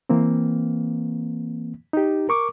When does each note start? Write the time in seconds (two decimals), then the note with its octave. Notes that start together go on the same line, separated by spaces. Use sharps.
0.09 E3 A#3 C4
1.93 D#4 G4
2.29 A#4 C#6 D6